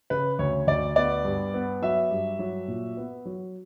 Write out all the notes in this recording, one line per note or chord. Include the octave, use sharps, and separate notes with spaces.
C#3 B4
D2 C#5
D2 D5
B3 D5
G2
B3
F#3 E5
G2
F#3
A#2
B3
F#3